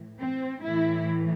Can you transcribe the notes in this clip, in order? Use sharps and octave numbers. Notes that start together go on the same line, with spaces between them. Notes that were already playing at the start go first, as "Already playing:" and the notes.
Already playing: A2 E3
C4
A2 E3 E4